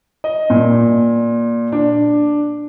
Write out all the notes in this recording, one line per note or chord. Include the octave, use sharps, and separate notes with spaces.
D#5
A#2
D4